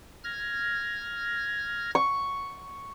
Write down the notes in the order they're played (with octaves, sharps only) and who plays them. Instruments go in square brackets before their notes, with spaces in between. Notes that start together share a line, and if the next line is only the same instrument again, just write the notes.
[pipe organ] F6 G#6 A#6
[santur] C#6